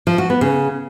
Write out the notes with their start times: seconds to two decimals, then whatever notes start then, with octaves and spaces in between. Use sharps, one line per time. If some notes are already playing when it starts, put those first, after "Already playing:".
0.07 F3
0.18 F#4
0.30 B3
0.41 C#3